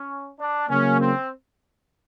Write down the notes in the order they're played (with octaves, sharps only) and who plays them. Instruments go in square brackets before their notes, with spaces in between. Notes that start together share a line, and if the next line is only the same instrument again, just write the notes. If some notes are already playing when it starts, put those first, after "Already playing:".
Already playing: [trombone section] C#4
D4
[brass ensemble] C#3 F#3 A#3 [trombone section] C#4
[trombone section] C4